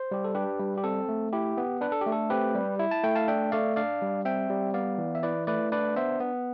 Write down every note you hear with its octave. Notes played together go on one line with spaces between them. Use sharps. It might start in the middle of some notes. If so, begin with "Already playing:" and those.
Already playing: C5
G3 G4
A4
D4 G4 B4
G3
G4
C4 A4
A3
E4 G4
B3
D4 B4
A4
G4
A3
A4
C4 G4 B4
G3
E4
A5
A3 G5
F5 A5
D4 E5 G5
A3 D5 F5
D4 D5 F5
G3
C4 E5 G5
G3
B3 D5 F5
E3
E5
E4 B4 D5
A3 B4 D5
D4 B4 D5
B3 C5 E5
B3